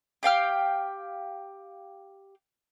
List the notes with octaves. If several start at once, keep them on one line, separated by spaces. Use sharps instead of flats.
G4 F5 G5 F6